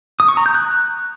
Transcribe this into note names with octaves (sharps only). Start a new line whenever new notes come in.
D#6
C#6
A#5
G6
F#6